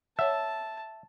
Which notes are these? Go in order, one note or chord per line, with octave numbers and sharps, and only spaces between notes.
C#5 E5 F#5 A5